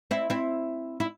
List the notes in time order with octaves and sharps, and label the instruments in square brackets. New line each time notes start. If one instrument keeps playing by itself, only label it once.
[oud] C4 E4
C4 E4
E4